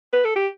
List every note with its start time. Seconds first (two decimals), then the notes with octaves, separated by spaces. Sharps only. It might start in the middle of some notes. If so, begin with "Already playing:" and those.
0.13 B4
0.25 A4
0.36 G4